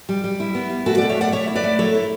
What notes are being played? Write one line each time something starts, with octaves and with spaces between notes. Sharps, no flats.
G3
G3
E4
B3
G3
A3 F#4 A4
D5 F#5
B2
C#5 E5
A3 D5 F#5
A3 C#5 E5
E4 C#5
B4 D5
A3
F#3 A4 C#5
E4